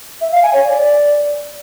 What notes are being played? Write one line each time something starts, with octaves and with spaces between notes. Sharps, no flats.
E5
F5
G#5
C#5
D5